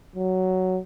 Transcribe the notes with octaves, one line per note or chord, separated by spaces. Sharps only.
F#3